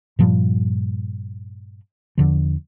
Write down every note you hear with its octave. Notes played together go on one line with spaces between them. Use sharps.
G2 A#2 F3 G3
E2 D3 F3